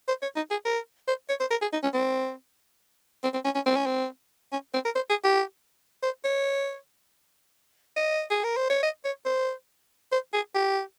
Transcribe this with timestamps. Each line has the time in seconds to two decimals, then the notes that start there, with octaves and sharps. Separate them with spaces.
0.08 C5
0.22 C#5
0.36 D#4
0.51 G#4
0.65 A#4
1.08 C5
1.29 C#5
1.40 C5
1.51 A#4
1.62 G#4
1.73 D#4
1.83 C#4
1.94 C4
3.23 C4
3.34 C4
3.45 C#4
3.55 C#4
3.66 C4
3.76 C#4
3.86 C4
4.52 C#4
4.74 C4
4.85 A#4
4.95 C5
5.10 G#4
5.24 G4
6.03 C5
6.24 C#5
7.97 D#5
8.30 G#4
8.44 A#4
8.57 C5
8.70 C#5
8.83 D#5
9.05 C#5
9.25 C5
10.12 C5
10.33 G#4
10.55 G4